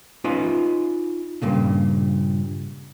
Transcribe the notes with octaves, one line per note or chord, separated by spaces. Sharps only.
C#4 D#4 F4 B4 D#5
G2 A#2 C#3